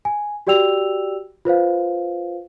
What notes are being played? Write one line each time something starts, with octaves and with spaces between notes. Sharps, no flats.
G#5
F#4 G4 D5 G5 E6 F7
F4 B4 C5 F5